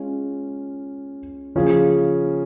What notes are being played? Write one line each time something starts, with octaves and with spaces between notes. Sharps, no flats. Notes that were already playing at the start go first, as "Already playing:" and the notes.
Already playing: G#3 C#4 F4
C#3 F3 C#4 G#4